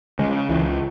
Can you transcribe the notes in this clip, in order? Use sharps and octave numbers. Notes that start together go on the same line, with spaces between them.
C#3 G#3
C#2 E3